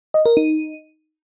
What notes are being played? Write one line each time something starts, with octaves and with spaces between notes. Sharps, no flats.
D#5
A#4
D#4